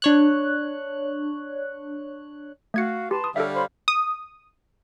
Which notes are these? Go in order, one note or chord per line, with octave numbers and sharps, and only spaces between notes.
D4 C#5 F#6
A3 F#4 F5 G#6 C#7
G4 B4 A5 C6
D#6
D3 G3 A4 C#5 E5 F5
C5 C#5 B5
D#6